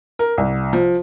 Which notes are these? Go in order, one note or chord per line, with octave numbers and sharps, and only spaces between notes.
A#4
C2
F3